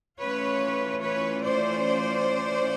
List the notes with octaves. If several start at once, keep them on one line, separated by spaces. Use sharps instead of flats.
E3 A3 C#4 F4 B4 C#5
B4 C#5
C5 D5